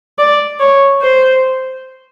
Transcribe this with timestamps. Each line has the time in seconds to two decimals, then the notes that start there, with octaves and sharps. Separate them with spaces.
0.19 D5
0.60 C#5
1.02 C5